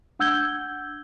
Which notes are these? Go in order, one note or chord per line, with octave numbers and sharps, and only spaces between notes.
D4 F#5 E6 G6 G#6 G7